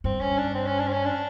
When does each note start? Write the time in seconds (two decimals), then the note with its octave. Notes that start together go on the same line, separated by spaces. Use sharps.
0.04 G2 C4
0.21 C#4
0.38 D4
0.55 C4
0.67 C#4
0.79 D4
0.87 C4
0.92 C#4
1.05 D4